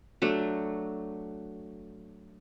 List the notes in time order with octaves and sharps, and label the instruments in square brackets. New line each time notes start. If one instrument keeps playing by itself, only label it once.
[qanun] F#3 A3 D4